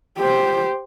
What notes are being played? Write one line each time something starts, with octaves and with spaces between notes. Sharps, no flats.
G4 C5